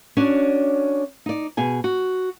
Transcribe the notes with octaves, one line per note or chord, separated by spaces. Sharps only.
C#4 D4 F#4 C#5 D5
D#4 D5
B2 G#4 G#5
F#4